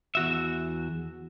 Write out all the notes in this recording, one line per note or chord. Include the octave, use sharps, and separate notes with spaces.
E2 F#4 E5